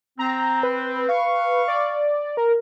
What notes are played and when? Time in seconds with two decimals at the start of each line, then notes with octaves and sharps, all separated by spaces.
0.19 C4 A#5
0.63 B4
1.09 F5 C#6
1.68 D5
2.37 A#4